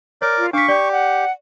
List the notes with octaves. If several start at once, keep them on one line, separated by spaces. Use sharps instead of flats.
A#4 C#5 D5
F4
D4 F5 C#6 D6 B6
G4 D5
F#5